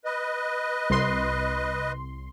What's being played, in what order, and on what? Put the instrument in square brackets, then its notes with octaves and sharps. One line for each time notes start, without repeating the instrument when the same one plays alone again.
[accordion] B4 D#5
[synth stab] C2 C6